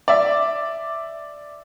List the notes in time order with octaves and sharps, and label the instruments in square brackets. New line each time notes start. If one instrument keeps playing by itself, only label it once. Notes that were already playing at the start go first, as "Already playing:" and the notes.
[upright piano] D5 E5